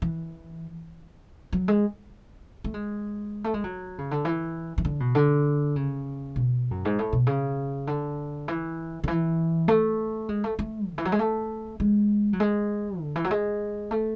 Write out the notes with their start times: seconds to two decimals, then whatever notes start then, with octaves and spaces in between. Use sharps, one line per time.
0.02 E3
1.53 F#3
1.68 G#3
2.64 A3
2.74 G#3
3.44 A3
3.54 G#3
3.64 F#3
3.98 C#3
4.11 D3
4.25 E3
4.78 E3
4.85 D3
5.00 B2
5.15 D3
5.76 C#3
6.36 B2
6.71 F#2
6.85 G#2
6.99 A2
7.13 B2
7.27 C#3
7.87 D3
8.48 E3
9.04 D3
9.08 E3
9.68 A3
10.29 G#3
10.44 A3
10.59 A3
10.91 D3
10.98 E3
11.05 F#3
11.12 G#3
11.19 A3
11.80 G#3
12.33 F#3
12.40 G#3
13.01 D3
13.16 E3
13.24 F#3
13.31 G#3
13.91 A3